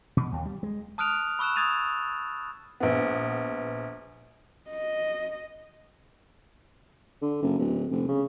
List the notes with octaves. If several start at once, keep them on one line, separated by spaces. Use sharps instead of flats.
B2
D#2
G3
G#3
A5 D#6 F6 F#6 D7 F7
B5 C#6 E6 F#6 E7
D#6 G#6 A6 D#7 F7
A#1 B3
D#5
D3
F#1
D1
F1
C#3